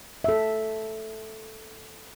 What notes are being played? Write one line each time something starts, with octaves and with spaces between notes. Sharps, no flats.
A4 E5